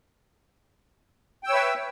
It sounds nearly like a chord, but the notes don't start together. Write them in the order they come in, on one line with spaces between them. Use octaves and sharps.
G5 E6 C#5 B4 E5